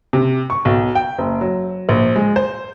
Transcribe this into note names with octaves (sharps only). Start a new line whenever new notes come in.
C3
C#6
B1
G5
F#1
F#3
A#1
G#3
C5